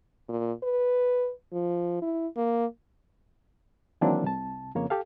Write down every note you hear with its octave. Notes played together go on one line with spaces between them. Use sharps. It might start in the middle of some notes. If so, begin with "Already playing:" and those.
A#2
B4
F3
E4
A#3
D#3 E3 F#3 A#3 C4 D4
C2 C3 A5
F2 C#3 A#3 C#5
G4 A4 F5